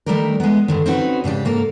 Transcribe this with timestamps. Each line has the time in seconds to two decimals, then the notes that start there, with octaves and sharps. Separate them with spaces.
0.06 D#3 G3 A3 D4 G4 A#4
0.40 G#3 B3
0.68 G2 D3 D#3
0.86 C4 C#4 D#4 F#4 A#4 B4
1.24 G#2 C#3 D4 G4
1.45 G#2 A#3 A4 A#4